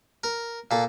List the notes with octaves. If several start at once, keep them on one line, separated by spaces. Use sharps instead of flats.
A#4
A#2 A4